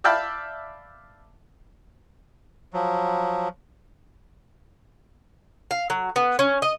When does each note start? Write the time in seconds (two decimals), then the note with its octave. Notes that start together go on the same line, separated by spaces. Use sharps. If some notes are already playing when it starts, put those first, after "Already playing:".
0.04 D5 E5 F5 G5 A5 B5
2.74 F3 F#3
5.71 F5
5.90 F#3
6.16 B3
6.39 C#4
6.62 D#5